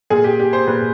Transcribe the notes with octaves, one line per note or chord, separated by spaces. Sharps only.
A#2 G#4
G4
G4
C5
A#2 B4